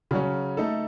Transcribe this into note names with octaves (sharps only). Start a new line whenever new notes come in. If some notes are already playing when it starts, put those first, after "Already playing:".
C#3 F#3 C#4
A3 D#4 A4